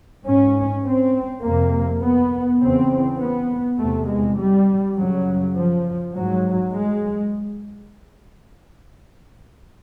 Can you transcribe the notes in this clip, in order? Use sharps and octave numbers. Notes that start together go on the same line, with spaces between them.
G#2 C#4
C4
F2 C3 A#3
B3
E2 C#3 C4
B3
E2 C3 A3
G#3
G3
F#2 C#3 F#3
F3
G#2 F#3
G#3